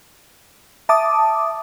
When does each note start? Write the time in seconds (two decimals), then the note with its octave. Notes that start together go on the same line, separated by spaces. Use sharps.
0.89 E5 A5 D6 D#6